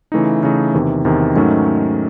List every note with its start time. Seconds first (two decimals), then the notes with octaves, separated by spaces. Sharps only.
0.12 C#3 E3 A3 D#4
0.43 C#3 E3 A3 D#4
0.74 E2 C3 D#3
1.05 E2 C3 D#3
1.35 G#2 D#3 F#3 A3 C#4